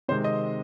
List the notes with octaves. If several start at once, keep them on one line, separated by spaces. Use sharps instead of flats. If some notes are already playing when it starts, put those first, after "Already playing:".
C3 D#3 G#3 C4 C5
D#5